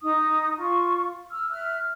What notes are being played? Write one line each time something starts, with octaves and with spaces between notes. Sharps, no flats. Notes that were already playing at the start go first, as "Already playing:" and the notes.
D#4 D#6
F4 C#6
E6 F6
E5 F6 F#6